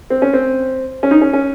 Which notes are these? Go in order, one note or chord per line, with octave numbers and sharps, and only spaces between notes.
C4
C#4
C4
C#4
D#4
C#4
C#4